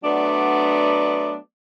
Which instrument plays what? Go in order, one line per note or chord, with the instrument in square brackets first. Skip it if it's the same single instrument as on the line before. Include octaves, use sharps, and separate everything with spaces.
[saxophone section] F#3 A3 B3 D4 D5